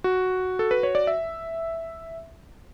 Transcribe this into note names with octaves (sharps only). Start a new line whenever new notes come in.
F#4
A4
B4
C#5
D5
E5